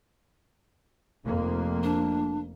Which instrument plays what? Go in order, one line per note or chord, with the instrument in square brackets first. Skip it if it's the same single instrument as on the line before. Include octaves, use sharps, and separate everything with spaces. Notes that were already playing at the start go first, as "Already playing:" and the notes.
[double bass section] F1 F2 A#3
[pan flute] D4